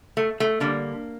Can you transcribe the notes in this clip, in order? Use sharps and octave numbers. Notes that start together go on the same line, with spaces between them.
A3
A3
D3 G3 A#3